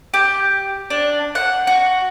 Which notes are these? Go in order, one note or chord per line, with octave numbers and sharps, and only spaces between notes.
G4
D4
F#5
F#4